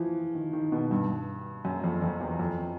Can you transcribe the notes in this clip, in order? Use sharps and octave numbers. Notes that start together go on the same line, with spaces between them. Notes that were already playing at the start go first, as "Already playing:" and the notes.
Already playing: E3 F3
D#3
D#3
B2
G2
F#2
F2
F2
E2
F2